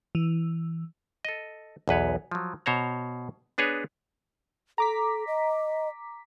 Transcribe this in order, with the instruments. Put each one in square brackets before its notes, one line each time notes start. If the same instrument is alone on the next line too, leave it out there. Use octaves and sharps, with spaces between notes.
[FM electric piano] E3
[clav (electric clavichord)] A4 D#5
B1 E2 B4 C#5
F3 F#3
B2 C5 C#5 A#5
B3 D4 G#4 B4 C#5
[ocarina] A4 [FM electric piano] A#5 D6 B6
[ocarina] D#5